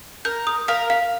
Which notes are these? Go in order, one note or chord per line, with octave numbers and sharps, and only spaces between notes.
A#4 G6
D#6
A#4 F5
F5